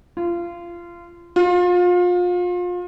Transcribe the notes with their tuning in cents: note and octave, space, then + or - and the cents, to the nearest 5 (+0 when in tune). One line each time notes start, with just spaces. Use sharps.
F4 -25
F4 +30